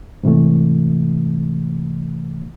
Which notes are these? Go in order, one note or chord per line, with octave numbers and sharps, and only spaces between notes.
G#2 C3 E3 A3